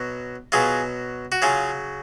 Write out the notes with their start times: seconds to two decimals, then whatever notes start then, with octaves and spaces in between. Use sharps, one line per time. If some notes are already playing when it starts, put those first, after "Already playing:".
Already playing: B2 F#3
0.52 B2 F#3 F4 G#4
1.32 F#4
1.42 C#3 F#3 F4 G#4